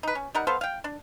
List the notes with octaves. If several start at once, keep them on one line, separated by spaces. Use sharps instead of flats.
D#4 B4
C#4
G3 D#4 A#4 F#5
B3 A4 C5 F5
F5 G5
D4